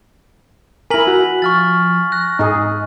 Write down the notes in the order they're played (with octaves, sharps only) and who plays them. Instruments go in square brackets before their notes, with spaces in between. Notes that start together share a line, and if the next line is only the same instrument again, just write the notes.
[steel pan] E4 A#4 [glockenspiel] G#5 B6 F#7
[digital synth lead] F#4
[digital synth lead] F3 [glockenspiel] C#6 F6 A6
[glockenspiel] F#6 [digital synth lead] A#6
[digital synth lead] G#2 [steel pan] D#4 G#4